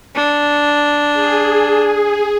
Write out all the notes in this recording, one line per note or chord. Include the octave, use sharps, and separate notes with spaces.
D4
G#4